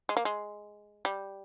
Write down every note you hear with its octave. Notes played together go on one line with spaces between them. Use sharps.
G#3
A#3
G#3
G3